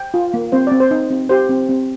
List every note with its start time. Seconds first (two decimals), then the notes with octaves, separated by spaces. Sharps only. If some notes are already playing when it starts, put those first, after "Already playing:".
Already playing: G5
0.14 F4
0.34 A#3
0.52 C4 C5
0.67 C4 D5
0.80 C5
0.91 D#4
1.10 C4
1.29 G4 C5
1.49 C4
1.69 C4